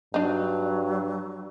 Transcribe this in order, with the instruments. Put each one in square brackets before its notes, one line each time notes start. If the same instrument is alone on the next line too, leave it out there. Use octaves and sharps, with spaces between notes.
[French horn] G2 [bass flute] F#3 [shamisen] D4 D#4